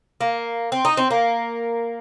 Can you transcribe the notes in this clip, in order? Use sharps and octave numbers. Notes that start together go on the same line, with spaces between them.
A#3
C4
D#4
C4
A#3